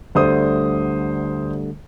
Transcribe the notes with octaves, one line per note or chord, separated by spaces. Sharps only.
D2 D3 G3 A3 C5 D#6